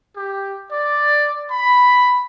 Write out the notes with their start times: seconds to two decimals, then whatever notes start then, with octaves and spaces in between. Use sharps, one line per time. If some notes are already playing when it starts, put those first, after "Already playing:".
0.16 G4
0.72 D5
1.51 B5